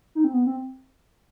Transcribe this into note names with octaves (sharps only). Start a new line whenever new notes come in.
D#4
C4
B3
C4